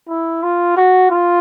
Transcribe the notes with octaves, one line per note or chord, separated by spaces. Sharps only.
E4
F4
F#4
F4